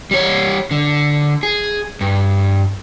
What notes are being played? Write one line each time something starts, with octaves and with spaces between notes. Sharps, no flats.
G3 C#5
D3
G#4
G2